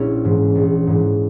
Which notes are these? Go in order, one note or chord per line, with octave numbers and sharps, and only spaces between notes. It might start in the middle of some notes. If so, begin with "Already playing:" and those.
Already playing: A#1 C#4 E4
G#2 E3
A#1
G#2 E3